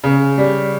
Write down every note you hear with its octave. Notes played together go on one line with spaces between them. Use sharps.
C#3
G3